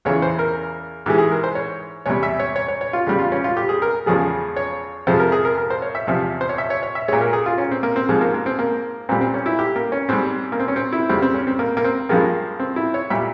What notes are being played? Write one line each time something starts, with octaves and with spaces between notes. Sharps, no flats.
E2 C#3 E3 C#5
C5
A#4
G#2 E3 G#3 G4
G#4
A#4
C5
C#5
E2 C3 G3 C#5
E5
C#5
C#5
C#5
C#5
F4
E2 C#3 G3
F4
C#4
F4
G4
G#4
A#4
E2 C#3 F3 G#3 G#4
C#5
F2 C3 F3 G#3 C5
A#4
G#4
A#4
A#4
C5
C#5
E5
E2 C3 F3
C5
C#5
E5
C#5
C#5
E5
A#2 G#3 C#5
A#4
G#4
F4
C#4
C4
A#3
C4
G#2 F3 G#3
A#3
A#3
C4
A#3
A#2 G3 C4
C4
C#4
E4
G4
A#3
C#4
G#2 G3 C4
A#3
C4
C#4
C4
E4
F2 C#3 G3 C4
C4
C#4
C4
A#3
A#3
C4
G2 F3 G#3 A#3
C4
E4
C#5
A#2 G3 E5